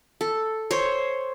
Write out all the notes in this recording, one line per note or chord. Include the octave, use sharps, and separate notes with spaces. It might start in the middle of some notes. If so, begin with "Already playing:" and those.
A4
C5 C#5